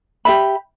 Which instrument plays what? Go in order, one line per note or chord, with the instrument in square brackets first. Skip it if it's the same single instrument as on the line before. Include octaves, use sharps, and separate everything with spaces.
[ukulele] G4 E5 B5